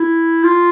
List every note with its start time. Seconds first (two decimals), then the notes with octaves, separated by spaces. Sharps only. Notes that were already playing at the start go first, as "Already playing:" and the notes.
Already playing: E4
0.44 F4